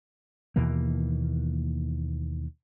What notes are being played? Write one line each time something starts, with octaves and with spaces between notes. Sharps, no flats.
D#2 B2 E3 A#3